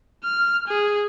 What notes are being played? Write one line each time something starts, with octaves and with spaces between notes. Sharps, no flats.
F6
G#4